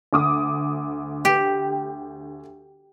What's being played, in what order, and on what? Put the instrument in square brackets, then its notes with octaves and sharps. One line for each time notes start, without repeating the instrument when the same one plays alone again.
[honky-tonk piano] D2 D6 D#6
[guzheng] G4